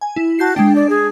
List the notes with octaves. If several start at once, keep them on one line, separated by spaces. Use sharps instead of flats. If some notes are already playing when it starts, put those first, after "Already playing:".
G#5
E4
F#4 A5 G6 C7
G#3 D4 G5
D5
G#4